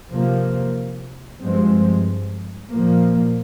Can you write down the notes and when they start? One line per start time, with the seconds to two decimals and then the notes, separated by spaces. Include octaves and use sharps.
0.11 C3 F3 A#3
1.41 G2 F3 G#3 C4
2.71 A#2 F3 A#3